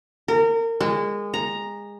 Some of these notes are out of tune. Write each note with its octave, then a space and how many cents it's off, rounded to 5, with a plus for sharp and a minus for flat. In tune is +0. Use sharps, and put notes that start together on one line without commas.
A#4 -30
G#3 -25
A#5 +5